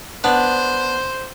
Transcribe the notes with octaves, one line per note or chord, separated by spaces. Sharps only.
B3 D4 C5